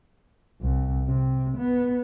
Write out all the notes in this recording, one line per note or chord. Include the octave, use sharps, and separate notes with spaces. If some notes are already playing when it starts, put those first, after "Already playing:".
C2
C3
B3